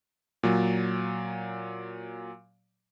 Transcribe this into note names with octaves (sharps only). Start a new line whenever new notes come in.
A#2 F#3